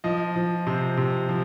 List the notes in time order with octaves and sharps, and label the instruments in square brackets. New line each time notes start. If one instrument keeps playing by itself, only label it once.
[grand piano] F3 D#5
F3
C3 C5
C3
F3